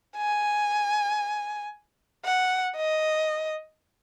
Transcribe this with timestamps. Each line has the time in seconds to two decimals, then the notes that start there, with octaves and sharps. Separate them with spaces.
0.17 G#5
2.25 F#5
2.76 D#5